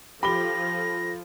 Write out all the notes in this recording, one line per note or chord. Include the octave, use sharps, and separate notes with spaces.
F3 F4 G4 A4 B5 A#6 G7